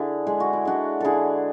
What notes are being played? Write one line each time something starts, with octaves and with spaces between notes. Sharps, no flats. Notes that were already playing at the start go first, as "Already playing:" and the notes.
Already playing: D3 D4 E4 G#4
G#3 G#4
F#4
E4
G#3 D4 F#4
D3 E4 G#4 A4